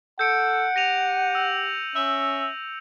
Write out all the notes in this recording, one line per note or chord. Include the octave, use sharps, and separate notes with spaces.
A4 F#5 G6 C#7 D7
G4 A#6 D#7 F7
E6
C#4 E5